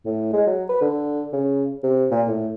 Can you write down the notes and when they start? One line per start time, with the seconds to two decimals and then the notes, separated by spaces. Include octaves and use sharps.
0.06 A2
0.33 G#3
0.47 F#3
0.69 B4
0.81 D3
1.33 C#3
1.84 C3
2.11 A#2
2.28 A2